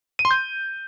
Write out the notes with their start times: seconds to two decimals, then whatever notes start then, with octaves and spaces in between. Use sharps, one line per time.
0.19 D#7
0.25 C6
0.31 G6